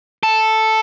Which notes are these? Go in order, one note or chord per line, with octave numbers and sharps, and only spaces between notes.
A4